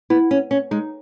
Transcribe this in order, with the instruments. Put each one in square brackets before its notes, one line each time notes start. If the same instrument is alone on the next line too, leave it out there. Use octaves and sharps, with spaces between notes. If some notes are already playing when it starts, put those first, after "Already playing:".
[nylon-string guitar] B3 [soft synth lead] E4
[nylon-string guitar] C#4
C#4
[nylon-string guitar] G#3 [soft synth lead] D#4